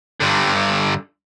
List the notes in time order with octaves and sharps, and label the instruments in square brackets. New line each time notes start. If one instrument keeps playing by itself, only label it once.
[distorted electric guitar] G2 D3